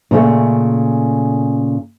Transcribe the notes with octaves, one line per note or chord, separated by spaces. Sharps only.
A#2 C#3 A3